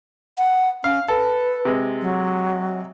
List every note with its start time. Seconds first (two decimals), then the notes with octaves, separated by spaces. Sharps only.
0.38 F#5
0.84 C#4 F5
1.08 A4 B4
1.65 C3 G#3
2.02 F#3